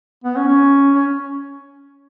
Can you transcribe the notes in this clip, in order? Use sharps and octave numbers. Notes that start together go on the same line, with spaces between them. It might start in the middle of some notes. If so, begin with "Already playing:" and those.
B3
C#4
C#4
C#4